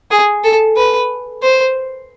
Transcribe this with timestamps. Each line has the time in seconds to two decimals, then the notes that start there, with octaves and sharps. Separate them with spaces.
0.11 G#4
0.44 A4
0.77 B4
1.43 C5